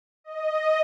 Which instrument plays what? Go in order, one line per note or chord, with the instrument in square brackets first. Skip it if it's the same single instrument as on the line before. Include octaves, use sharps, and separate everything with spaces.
[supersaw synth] D#5